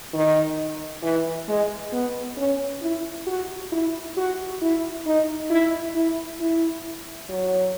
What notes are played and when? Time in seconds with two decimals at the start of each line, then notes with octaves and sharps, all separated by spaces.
0.13 D#3
1.03 E3
1.48 G#3
1.93 B3
2.37 C#4
2.82 E4
3.26 F#4
3.72 E4
4.17 F#4
4.61 E4
5.06 D#4
5.50 E4
5.95 E4
6.40 E4
7.29 F#3